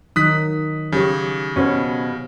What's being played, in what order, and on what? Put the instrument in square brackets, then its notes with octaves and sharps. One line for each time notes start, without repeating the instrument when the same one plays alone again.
[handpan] D#3 F#3 D#4 [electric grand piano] D#6 F#6 B6
[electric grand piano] C#3 [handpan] F#3 G4 C#5
[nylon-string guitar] B2 F#4 C5 [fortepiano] C#4